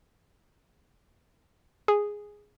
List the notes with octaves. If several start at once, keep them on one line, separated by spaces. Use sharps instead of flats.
G#4